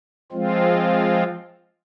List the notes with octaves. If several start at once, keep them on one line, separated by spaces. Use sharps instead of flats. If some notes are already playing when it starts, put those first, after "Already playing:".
F3 G#3 C4 F4